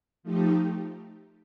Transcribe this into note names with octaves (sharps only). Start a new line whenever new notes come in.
F3 A3 D#4 G4